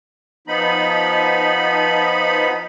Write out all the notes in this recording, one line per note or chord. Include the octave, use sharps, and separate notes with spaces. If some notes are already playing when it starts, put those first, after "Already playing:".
F3 B3 D#4 B5